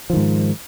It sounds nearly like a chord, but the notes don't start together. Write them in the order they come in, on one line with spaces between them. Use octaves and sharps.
F3 D#3 G#2